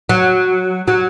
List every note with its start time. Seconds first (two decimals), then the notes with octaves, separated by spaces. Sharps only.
0.09 F#3
0.88 F#3